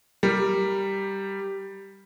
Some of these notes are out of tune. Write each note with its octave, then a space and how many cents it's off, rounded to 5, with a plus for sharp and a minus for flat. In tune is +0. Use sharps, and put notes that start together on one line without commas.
G3 +0 A#4 +0